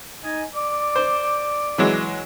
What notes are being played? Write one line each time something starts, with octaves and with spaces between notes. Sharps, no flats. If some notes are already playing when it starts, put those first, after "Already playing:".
D#4 D#5 G#5
D5 D6
C5
E3 F#3 G#3